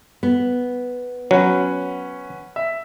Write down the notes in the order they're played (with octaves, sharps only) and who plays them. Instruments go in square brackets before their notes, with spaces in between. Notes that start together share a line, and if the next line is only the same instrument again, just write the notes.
[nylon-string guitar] B3
[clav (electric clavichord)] F#3 [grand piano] C#4 B4 F#5
[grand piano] E5